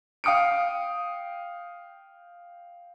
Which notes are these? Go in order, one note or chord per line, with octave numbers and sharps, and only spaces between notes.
F5 G5 D#6 C#7 D7